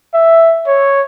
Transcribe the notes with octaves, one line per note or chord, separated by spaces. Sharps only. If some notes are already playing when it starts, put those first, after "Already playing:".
E5
C#5